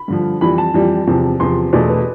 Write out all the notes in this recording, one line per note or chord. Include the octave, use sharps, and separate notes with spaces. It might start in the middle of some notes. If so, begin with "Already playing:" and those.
Already playing: B5
G2 D3 F3
F2 E3 G3 B5
A5
F2 E3 G3
E2 C3 F3
E2 C3 F3 C6
E2 B2 A3 D5
B4